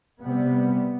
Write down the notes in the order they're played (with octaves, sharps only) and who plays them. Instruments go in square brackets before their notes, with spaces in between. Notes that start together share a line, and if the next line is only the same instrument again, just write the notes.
[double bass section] C3 G3 B3